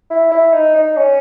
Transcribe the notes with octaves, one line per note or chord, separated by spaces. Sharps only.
E4
E4
D#4
D#4
C#4